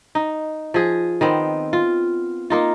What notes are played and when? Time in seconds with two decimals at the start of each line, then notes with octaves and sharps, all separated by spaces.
0.15 D#4
0.74 F3 G#4
1.21 D#3 B3 C4
1.73 F4
2.50 A#3 D#4 F4